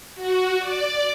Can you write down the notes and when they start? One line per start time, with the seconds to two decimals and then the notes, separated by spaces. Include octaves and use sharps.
0.15 F#4
0.59 D5